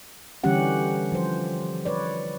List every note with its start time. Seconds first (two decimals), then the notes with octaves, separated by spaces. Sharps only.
0.44 D3 E3 G3 C#4 G4 F#5
1.12 F3 C5
1.85 B4 C#5 D5